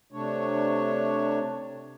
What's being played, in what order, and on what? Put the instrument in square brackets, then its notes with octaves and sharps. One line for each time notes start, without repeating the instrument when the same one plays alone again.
[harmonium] C3 A3 D4 C#5